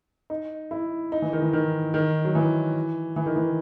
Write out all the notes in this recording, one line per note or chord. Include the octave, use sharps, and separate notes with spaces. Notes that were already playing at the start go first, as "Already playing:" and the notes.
D#4
E4
D#4
E3
D#3
E3
D#3
D#3
F#3
E3
E3
D#3
E3